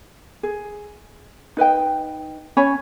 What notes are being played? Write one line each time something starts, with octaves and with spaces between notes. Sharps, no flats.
G#4
D#4 B4 D#5 G5
C#4 C#5 G#5 B5